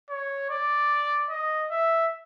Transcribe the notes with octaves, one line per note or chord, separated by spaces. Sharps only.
C#5
D5
D#5
E5